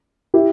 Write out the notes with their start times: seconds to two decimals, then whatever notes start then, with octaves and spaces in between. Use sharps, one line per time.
0.34 E4 G4